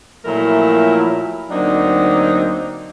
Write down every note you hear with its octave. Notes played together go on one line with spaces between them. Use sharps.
A#2 F3 F#3 A3 E4 A#4
D2 F#3 A#3 C4 D4 D#4